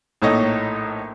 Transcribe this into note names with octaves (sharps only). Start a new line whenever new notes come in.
A#1 A2 D#4 A4 C#5 D#5